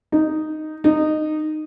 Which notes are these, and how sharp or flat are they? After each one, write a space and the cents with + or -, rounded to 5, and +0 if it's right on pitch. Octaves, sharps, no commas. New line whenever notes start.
D#4 -5
D#4 -15